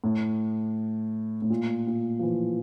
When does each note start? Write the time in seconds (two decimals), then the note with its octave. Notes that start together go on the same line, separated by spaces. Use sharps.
0.04 A2
1.42 A2
1.50 A#2
1.87 A#2
2.19 F3
2.23 E3